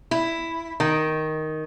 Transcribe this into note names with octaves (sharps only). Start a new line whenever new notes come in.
E4
D#3